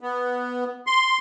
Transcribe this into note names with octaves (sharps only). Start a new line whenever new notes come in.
B3
C6